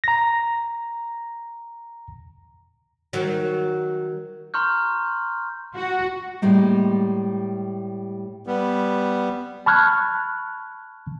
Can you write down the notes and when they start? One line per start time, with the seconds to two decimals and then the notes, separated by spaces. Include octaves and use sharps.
0.04 A#5 A#6
3.13 D#3 F#3
4.54 A#5 C6 C#6 F6 G6
5.75 F#4
6.42 A2 G3 G#3 A#3
8.47 G3 B3
9.66 A5 B5 C#6 F6 F#6 G#6